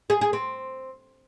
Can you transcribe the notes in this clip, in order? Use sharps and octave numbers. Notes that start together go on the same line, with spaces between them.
G#4
G#4
C4